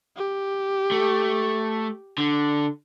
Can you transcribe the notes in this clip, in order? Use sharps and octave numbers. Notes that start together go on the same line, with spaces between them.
G4
A3
D3